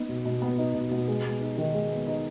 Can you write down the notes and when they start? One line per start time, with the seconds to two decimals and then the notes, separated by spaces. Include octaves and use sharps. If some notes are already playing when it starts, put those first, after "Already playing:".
Already playing: B3 D#4
0.09 B2
0.25 B2
0.42 B3
0.58 D#4
0.74 B2
0.91 B2
1.08 G#3
1.25 B3
1.41 D#4
1.57 D#3
1.74 G#3
1.91 B3
2.07 D#4